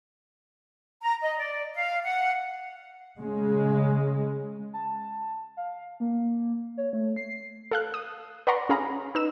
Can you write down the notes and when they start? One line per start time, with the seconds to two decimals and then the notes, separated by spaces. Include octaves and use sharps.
1.01 A#5
1.22 D#5
1.38 D5
1.74 F5
2.04 F#5
3.19 C#3 G#3
4.73 A5
5.57 F5
6.00 A#3
6.78 C#5
6.93 A3
7.16 C7
7.71 A4 F5 F#6
7.94 D#6
8.47 B4 D5 F#5 A#5 C6 C#6
8.69 C#4 G#4 F5 A#5 B5
9.15 D#4 B4 E6 E7